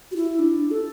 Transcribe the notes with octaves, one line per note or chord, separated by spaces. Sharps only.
F#4
E4
D4
A4